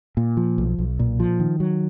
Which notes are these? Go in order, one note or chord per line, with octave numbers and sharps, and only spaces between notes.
A#2
F3
B1
B1
A#2
F3
D#3
F#3